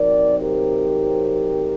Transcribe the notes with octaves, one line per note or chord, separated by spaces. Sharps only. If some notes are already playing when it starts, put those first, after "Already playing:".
Already playing: C3 F#3 C4 D#4 A#4 D5
G4 A#4